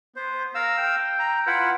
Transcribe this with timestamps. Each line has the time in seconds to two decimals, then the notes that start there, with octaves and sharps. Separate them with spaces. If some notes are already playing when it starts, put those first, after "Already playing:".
0.16 B3 C5
0.55 A#4 F5 E6
0.78 G5
1.19 A#5
1.47 E4 F4 B4 F#5